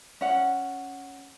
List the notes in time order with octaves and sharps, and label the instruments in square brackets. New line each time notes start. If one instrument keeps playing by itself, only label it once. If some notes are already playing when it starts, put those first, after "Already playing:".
[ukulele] C#4 F#5